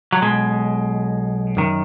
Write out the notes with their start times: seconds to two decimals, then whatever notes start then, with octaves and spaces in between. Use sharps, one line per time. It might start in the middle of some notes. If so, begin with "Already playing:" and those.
0.12 F#3
0.22 B1 B2 G#3
1.57 F#2 D#3